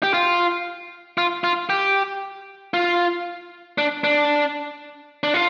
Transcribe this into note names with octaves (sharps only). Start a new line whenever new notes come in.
G4
F4
F4
F4
G4
F4
D4
D4
D4
F4